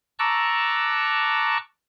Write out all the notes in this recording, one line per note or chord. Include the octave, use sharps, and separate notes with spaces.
A5 A#5 C#6 D6 E6 F#6